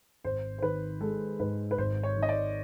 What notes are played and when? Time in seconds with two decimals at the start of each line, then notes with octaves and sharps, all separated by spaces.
0.24 G#1 C5
0.58 C5
0.63 D#3 B4
1.01 G#3 A4
1.40 G#2 B4
1.71 B4
1.78 G#1 C5
2.03 C#5
2.17 D#3
2.23 D#5
2.29 D5